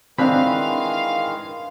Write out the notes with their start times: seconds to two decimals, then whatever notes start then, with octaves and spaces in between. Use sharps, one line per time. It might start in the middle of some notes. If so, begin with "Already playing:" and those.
0.18 D#3 E3 G#3 C4 D4 F5 B5 F#6